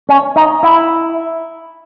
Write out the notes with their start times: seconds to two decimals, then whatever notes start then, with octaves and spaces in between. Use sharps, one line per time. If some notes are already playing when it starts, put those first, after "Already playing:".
0.09 C#4
0.36 D#4
0.63 E4